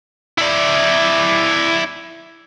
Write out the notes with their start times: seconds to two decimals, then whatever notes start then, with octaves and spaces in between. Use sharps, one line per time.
0.38 E4 D5